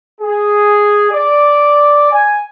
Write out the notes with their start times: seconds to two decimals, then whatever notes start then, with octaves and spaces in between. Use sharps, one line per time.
0.21 G#4
1.11 D5
2.12 G#5